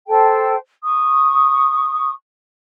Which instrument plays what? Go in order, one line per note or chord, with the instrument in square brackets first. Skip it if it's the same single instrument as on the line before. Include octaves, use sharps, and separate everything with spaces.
[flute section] A4 C5 G5 A5
C#6 D#6